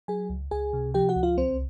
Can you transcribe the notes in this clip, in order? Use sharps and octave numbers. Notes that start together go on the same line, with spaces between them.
F#3 G#4 G#5
C#2
C#2 G#4 G#5
C3
F3 G4 G5
F#4 F#5
C#2
F4 F5
C2 C4 C5